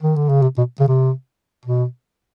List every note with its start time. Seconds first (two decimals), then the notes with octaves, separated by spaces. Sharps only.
0.02 D#3
0.16 D3
0.29 C#3
0.42 C3
0.58 B2
0.80 C#3
0.88 C3
1.65 B2